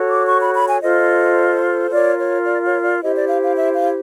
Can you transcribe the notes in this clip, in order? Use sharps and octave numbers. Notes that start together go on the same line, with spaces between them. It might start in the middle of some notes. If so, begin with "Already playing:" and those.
Already playing: F#4 A4 C#5
D6
C#6
B5
B5
G#5
F4 A4 C5 D#5
F4 A#4 C#5 D5
C#5
D5
C#5
D5
E4 G4 C5 D#5
D5
F5
F5
E5
F5